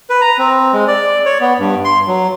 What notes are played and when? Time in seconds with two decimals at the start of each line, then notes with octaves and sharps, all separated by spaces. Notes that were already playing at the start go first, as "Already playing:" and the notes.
0.10 B4
0.21 A#5
0.38 C4
0.73 G#3
0.88 D5
1.25 C#5
1.41 B3
1.59 G2
1.84 C6
2.07 F#3